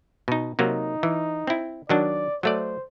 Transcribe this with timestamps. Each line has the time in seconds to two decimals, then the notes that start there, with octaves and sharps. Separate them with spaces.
0.28 B2 D#4
0.59 C3 F#3 A#3 D#4
1.03 E3
1.47 C4 E4
1.89 D#3 F#3 D4 D5
2.43 F#3 A3 C5 D5